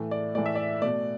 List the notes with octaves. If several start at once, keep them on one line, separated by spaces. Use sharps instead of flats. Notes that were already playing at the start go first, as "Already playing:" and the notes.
Already playing: A2 E3 A3
D5
A2 E3 A3 D5
E5
D5
B2 A3 D5